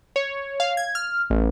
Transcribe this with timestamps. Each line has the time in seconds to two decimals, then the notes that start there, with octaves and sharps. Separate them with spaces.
0.16 C#5
0.60 F5
0.77 G#6
0.95 F6
1.30 A1